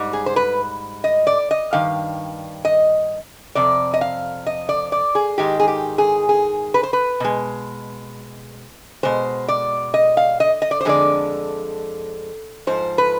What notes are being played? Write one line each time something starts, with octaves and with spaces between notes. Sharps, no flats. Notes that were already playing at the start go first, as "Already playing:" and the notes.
Already playing: G#2 G3
G#4
C5
B4
D#5
D5
D#5
G2 D#3 F5
D#5
F2 C3 D5
D#5
F5
D#5
D5
D5
G#4
G#2 D#3 G#3 G4
G#4
G4
G#4
G#4
B4
C5
B4
B2 G#3
B2 G#3 C5
D5
D#5
F5
D#5
D#5
D5
C5
F2 D3 G#3 D5
G#2 F3 C5
B4